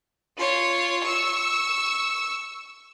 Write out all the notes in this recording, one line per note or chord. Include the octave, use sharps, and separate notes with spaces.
F4 C#5
C#6 E6